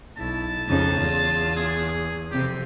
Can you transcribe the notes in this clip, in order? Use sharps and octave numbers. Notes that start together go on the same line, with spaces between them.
B1 E4 A5
F2 C#3 G#3 D#4
E2 F4
G#4
F2 C3 G4